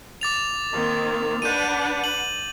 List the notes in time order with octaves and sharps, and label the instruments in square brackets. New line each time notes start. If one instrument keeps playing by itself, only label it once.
[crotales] D6 A6 F7
[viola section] D#3 A#3 C4
[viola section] D4 B4 F#5 [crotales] G6 D#7
[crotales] F#7